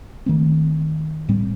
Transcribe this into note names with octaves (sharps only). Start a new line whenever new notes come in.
D#3 A3 C4
A2 G3 C4